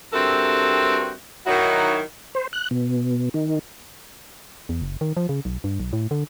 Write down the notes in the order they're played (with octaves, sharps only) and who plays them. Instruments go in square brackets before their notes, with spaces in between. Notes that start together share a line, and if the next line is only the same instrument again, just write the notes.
[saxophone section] G2 C4 F#4 A4 A#4 E5
D#3 F#3 D#4 E4 F#4
[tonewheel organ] C5
F#6
B2
D#3
[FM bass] E2
F#1
D#3
F3
C#3
B1
G2
B1
A2
D3